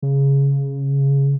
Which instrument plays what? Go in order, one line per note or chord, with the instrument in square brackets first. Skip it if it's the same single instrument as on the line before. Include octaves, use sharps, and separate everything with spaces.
[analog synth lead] C#3